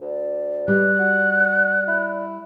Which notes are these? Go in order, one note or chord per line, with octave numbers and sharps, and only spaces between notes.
D2 D5
B2 G3 F#6
F#4
E4